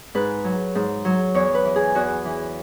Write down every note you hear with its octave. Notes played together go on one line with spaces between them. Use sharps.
G#2 B4
F#3
G#2
F#3
E2 C#5
B4
E3
G#4
E2 F#4
E3